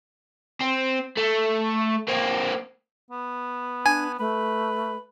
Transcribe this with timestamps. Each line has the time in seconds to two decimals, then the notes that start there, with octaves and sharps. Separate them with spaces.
0.61 C4
1.17 A3
2.08 A#3 C4
3.11 B3
3.86 D4 G#5
4.19 A3 B4